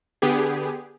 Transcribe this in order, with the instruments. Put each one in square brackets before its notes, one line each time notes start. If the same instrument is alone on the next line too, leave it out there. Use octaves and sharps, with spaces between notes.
[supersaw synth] D3 B3 G4 G#4